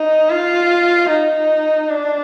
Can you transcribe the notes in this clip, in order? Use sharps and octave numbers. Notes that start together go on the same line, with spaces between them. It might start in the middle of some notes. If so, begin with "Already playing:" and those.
Already playing: D#4
F4
D#4
D4